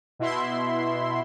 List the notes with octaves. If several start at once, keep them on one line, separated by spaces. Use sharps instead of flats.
B2 E4 E5 C6